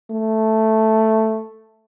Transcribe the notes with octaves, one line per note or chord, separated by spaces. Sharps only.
A3